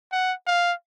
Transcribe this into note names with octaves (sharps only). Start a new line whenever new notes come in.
F#5
F5